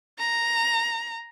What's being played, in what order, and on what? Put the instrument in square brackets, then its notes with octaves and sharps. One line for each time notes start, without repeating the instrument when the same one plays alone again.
[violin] A#5